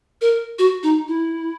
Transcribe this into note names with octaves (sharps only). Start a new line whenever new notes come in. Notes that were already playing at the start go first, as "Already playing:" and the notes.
A#4
F#4
D#4
E4